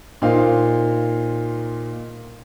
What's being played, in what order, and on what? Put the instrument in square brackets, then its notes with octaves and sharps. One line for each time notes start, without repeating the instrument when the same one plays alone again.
[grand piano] A#2 D#4 C5 F5